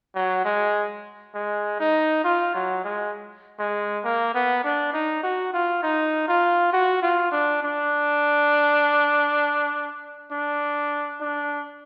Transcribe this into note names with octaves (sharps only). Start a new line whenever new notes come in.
F#3
G#3
G#3
D#4
F4
F#3
G#3
G#3
A#3
B3
D4
D#4
F#4
F4
D#4
F4
F#4
F4
D4
D4
D4
D4